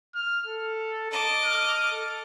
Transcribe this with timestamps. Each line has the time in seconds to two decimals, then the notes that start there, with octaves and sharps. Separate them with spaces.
0.15 F6
0.46 A4
1.11 D#5 A5 D6
1.45 F6
1.91 A4